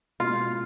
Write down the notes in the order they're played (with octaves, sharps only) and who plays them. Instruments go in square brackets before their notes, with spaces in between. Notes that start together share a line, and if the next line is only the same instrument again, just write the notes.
[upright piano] B2 G#3 C#4 E4 [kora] F4